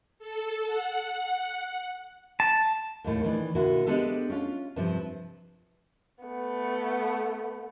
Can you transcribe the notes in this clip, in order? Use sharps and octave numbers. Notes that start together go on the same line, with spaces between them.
A4
F#5
A5
D#2 A2
D#3 E3 D4
A#2 D3 E4 F#4
G#3 A#3 B3 D4 G4 A4
C#4 F4
G2 C3 F3
A3 B3